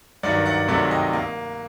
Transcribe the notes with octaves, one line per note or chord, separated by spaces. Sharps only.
G2 D#3 F#3 D5 F#5
D5 F#5
C2 C3 D#3 F#3 A3 D5 F#5
D#5 G5
A#3